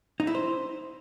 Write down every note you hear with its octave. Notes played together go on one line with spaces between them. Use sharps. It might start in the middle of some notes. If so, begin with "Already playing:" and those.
D#4
E4
C5